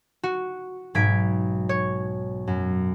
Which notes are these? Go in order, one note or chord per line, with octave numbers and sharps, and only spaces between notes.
F#4
B1 G#2 G#6 B6 D7
C#5
F#2